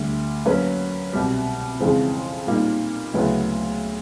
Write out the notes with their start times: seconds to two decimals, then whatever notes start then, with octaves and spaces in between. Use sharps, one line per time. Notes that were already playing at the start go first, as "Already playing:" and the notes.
Already playing: D2 D3 G3
0.45 F#3 A#3 C#4 F#4 B4
1.13 C2 B2 G3
1.80 F2 C#3 E3 G#3 C4
2.47 A#2 G3 A#3 D#4
3.14 D2 C#3 F#3 B3 E4